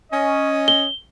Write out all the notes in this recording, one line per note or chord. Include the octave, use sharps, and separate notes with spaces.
C#4 D#5
G7